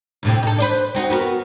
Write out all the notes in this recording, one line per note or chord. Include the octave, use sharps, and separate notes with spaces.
D2 A2 C3
D#4 A4
B4 C5 D5
C4 D#4 F#4
B3 F#4 A#4